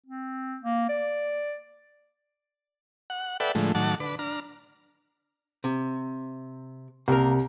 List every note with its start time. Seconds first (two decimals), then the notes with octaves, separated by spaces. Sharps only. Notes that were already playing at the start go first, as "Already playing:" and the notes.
0.06 C4
0.63 A#3
0.89 D5
3.10 F#5
3.40 A4 B4 D5 E5 F#5 G5
3.55 A2 D3 F3 G#3 A3
3.75 A2 D#3 F#3 F#5 A5 D6
4.00 D3 B4 D6
4.19 D4 A#5 F6
5.64 C3
7.08 C2 A#3 A#4